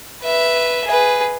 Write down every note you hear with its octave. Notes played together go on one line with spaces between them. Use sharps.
B4 E5
G#4 B4